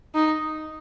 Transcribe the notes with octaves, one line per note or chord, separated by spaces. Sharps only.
D#4